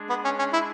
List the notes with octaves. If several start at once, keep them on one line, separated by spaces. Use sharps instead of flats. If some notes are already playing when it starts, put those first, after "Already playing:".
Already playing: G#3 D4 G#4
B3
C#4
C#4
E4